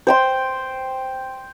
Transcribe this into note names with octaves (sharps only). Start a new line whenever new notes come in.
C5 G5 C6